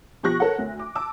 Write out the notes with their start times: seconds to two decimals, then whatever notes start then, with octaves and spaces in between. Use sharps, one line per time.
0.23 B2 F3 G4 C#6 F#6 A#6
0.40 A4 A#4 C#5 F#5
0.58 D2
0.79 D6
0.95 A5 D6 E6